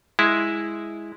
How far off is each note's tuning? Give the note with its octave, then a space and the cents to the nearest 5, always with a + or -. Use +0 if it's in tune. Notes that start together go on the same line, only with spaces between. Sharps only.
G#3 +0 E4 +0